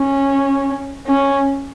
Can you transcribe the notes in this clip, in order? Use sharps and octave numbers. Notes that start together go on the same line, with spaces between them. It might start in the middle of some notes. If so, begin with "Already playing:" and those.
Already playing: C#4
C#4